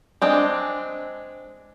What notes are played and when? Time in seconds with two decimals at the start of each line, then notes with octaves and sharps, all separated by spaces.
0.22 G#3 C4 D4